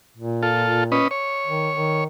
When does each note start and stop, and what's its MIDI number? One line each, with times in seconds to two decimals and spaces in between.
0.17 1.01 46
0.43 0.84 65
0.43 0.84 69
0.92 1.08 61
0.92 1.08 71
0.92 1.08 75
1.11 2.04 73
1.46 1.69 51
1.75 2.06 51